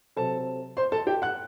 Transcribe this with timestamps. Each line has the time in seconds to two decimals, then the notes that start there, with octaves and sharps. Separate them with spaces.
0.16 C3 F#3 C4 A4 A5
0.77 C5 C6
0.92 A4 A5
1.07 G4 G5
1.22 F#5 F#6